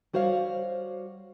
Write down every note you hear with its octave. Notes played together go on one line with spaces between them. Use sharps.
G3 F#4 C5 C#5 F5